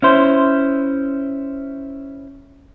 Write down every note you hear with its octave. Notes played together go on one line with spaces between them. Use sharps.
C#4 E4 C5